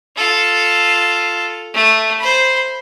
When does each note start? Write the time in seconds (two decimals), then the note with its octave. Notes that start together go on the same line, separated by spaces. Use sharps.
0.16 F4 A4
1.74 A3
2.19 C5 B5